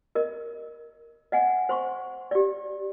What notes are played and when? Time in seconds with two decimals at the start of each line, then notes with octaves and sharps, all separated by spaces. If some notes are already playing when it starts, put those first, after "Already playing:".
0.15 A#4 D#5
1.32 D#5 F#5 G#5
1.69 C5 C6 C#6
2.31 G4 D5